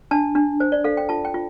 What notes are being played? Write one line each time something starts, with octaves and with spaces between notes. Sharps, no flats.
D4 A5
D4
C5
D5
A4 F5
G5
F4 A5
G5
F4